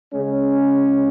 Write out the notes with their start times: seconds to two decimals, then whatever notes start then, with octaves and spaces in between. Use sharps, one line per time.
0.12 C#3 G#3 C#4